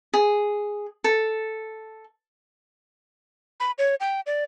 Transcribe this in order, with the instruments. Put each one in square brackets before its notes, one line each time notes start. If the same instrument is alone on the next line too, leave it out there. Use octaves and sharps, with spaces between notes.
[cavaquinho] G#4
A4
[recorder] B5
C#5
G5
D5